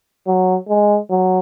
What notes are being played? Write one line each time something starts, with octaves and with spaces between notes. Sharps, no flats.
F#3
G#3
F#3